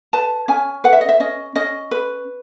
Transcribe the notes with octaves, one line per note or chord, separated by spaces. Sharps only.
B4 A5
C#4 G#5
B4 F#5
E5
D#5
E5
C#4 D#5
C#4 D#5
B4